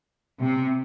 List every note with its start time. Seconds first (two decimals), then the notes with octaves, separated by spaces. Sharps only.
0.42 C3